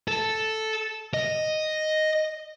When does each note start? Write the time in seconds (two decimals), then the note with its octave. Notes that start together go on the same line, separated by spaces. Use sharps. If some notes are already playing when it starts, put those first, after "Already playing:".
0.08 A4
1.14 D#5